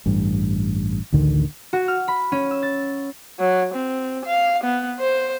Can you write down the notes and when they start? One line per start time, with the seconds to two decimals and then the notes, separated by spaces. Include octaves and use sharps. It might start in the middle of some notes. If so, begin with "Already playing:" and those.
0.06 A1 G2
1.12 A1 D2 D3 D#3
1.73 F#4
1.88 F6
2.08 B5
2.32 C#4
2.51 E6
2.62 A6
3.39 F#3
3.74 C4
4.25 F5
4.64 B3
5.00 C5